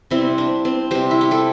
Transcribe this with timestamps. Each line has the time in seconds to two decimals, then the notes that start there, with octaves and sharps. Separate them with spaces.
0.11 C3 G3 C4 E4
0.38 D4
0.65 C4
0.91 C3 G3 G4 C5
1.11 E4
1.21 G4
1.31 E4 A4